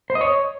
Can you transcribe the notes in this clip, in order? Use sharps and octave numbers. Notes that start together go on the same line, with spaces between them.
C5
D#5
C#5